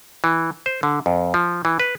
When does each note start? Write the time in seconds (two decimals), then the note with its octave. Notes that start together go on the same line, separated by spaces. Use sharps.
0.24 E3
0.66 C5
0.83 D3
1.06 F2
1.34 F3
1.65 E3
1.80 B4